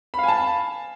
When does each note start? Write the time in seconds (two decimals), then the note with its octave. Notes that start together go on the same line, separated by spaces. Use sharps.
0.14 B5
0.19 F5
0.23 G#5
0.28 A5